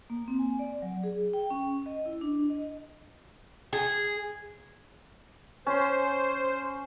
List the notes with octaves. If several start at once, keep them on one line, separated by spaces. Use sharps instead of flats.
A#3
C4
G#5
D5
F#3
G#4
G5
C#4
D#5
E4
D4
D#5
G#4
C#4 C5